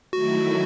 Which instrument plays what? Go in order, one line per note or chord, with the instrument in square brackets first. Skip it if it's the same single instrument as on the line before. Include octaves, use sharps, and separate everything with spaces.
[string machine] D#3 F#3 A3 E4 [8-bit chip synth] F#4